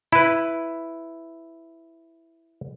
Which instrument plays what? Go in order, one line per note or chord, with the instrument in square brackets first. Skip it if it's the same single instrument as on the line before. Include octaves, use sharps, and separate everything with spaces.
[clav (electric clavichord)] E4 B4